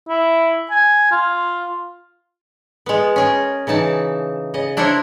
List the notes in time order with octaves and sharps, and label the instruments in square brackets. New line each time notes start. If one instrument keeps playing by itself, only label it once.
[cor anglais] E4
G#5
F4
[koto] G#3 B3
C#4 G#4 A#4
C#3 E3 D#4 A5
C#3 D#5
D4 E4 A#4 C5 C#5